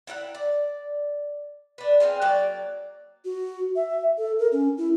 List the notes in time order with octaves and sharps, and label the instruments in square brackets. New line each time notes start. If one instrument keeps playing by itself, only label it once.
[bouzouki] E4 A#4 E5 F#5
D5
D4 B4
C4 C#4 F4 G#4
F#3 A#3 D5
[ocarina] F#4
E5
A4
A#4
C#4
E4